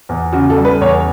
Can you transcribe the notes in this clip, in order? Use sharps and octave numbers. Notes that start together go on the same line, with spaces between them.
E2
C#3 F#4
A4
G3
B4
E2 C#5